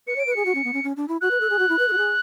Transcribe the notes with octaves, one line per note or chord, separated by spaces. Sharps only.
B4 C#7
C#5
D7
B4
G#4 C#7
F#4
C#4
B3
C#4
C#4
D4
E4
F#4 F#6
B4
A4
G#4
F#4
E4
B4
A4
F#4
G#4